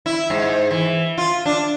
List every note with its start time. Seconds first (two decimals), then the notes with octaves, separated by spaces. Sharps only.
0.06 E4
0.30 G#2
0.71 E3
1.18 F4
1.46 D4